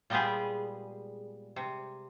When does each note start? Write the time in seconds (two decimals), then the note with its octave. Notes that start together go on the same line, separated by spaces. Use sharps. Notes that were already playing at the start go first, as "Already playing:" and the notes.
0.10 A#2 G3 G#3 B3 G4 G#4
1.56 C3